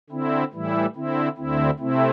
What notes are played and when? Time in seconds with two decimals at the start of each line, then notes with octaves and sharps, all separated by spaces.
0.10 D3 C4 E4
0.52 A2 E3 G3 E4
0.95 D3 C4 E4
1.37 D2 D3 C4 E4
1.79 C3 A3 C4 E4